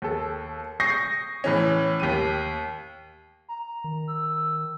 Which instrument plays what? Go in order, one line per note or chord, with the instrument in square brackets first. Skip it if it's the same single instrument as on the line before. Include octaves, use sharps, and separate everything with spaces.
[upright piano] D#2 A4
C#6 D#6 G6 A#6 C7
A2 E3 C#4
D#2 G4 D#7
[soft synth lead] A#5
[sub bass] D#3
[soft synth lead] E6